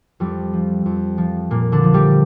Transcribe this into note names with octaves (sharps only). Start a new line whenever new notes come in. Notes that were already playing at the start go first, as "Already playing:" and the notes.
F2 G3
F3
F2
F3
A#2 A#3
D3 D4
F3
G3 G4